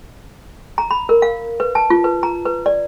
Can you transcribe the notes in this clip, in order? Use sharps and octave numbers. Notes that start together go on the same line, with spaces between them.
A#5
B5
A#4
F5
B4
A5
F4
B4
A#5
B4
D5